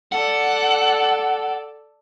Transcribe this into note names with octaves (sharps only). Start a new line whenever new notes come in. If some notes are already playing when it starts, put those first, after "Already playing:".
A4 D5 F#5